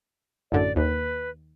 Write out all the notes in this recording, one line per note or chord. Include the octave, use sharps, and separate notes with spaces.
A1 F#2 D3 D5
D#2 B4